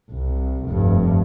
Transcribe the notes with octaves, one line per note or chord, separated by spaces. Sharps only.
C2
F1 G2